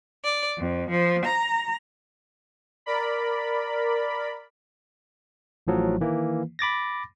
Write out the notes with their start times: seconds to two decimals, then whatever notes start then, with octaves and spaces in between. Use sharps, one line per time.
0.24 D5
0.58 F2
0.90 F3
1.25 A#5
2.86 A#4 D5 B5
5.67 A1 A2 F3 F#3
6.00 D#3 E3 A#3
6.59 B5 D6 A6 A#6